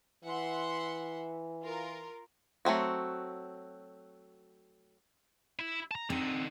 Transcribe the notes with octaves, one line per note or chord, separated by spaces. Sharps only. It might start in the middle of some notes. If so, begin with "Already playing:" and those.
E3 E5 F#5 C6
F4 A#4
F#3 A3 C4 F#4
E4
A5 A#5
D3 C4 D#4